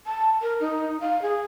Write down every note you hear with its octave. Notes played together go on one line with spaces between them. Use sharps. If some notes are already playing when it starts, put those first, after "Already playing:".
A5
A#4
D#4
F5
G#4